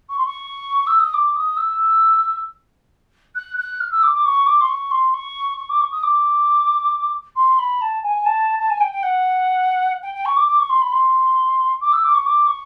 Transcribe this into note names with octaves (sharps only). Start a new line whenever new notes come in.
C#6
C6
C#6
E6
D#6
D6
D#6
E6
F#6
F#6
F6
E6
D6
D6
C#6
D6
C6
C#6
C6
C#6
C#6
D6
C#6
D#6
D6
C6
B5
A5
G#5
A5
A5
G#5
G5
G5
F#5
G5
G5
C#6
D6
D6
C#6
C6
B5
C6
D6
E6
D6
C#6
D6
C#6